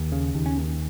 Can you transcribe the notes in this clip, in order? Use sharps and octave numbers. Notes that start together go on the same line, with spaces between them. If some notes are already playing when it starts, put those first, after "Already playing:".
Already playing: D#2
C#3
D#2
C#4
D#2